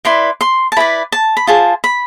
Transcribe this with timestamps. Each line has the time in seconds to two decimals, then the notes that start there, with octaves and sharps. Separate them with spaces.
0.05 E4 B4 D5 C6
0.41 C6
0.72 A5
0.76 E4 B4 D5 B5
1.12 A5
1.37 B5
1.47 F4 G#4 C5 A5
1.84 B5